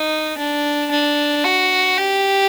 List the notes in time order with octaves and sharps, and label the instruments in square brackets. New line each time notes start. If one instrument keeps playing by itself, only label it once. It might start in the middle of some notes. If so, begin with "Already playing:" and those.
Already playing: [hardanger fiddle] D#4
D4
D4
F#4
G4